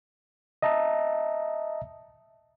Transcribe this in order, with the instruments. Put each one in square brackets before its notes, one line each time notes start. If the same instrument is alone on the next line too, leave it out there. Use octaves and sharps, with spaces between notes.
[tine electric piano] D#5 E5 A5 A#5